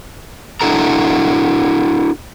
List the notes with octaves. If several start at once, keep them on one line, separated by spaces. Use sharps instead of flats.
D4 E4 F#4 A4 A#5